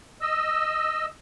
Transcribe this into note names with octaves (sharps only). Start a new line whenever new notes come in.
D#5 E6